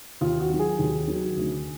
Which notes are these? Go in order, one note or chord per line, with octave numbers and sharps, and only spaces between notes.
D#2 F4
F#4
D#3 F#3
G#4
D#2
D#3 F#3
D2